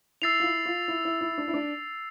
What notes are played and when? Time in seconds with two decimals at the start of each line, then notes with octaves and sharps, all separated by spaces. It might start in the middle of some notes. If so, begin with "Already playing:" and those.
0.22 E4 E6 A6 C7 F7
0.40 F4
0.44 E4
0.66 F4
0.88 E4
1.05 E4
1.21 E4
1.38 D4
1.48 E4
1.54 D4